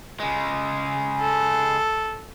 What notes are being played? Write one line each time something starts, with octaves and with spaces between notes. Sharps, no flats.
C#3 G#3
A4